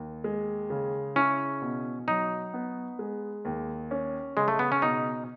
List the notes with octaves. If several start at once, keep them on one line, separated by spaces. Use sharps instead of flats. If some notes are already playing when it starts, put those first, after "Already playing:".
Already playing: D#2
G#3
C#3
C#4 E4
B2
F#3 D#4
B3
G#3
D#2
C#4
C#3 G#3
A3
B3
C#4
B2 D#4